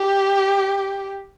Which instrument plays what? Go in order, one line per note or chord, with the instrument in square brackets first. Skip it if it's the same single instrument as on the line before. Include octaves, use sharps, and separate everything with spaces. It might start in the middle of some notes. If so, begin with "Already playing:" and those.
Already playing: [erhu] G4